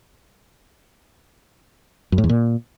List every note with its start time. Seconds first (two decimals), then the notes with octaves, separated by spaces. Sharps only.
2.12 F#2
2.18 A2
2.24 E2
2.29 A#2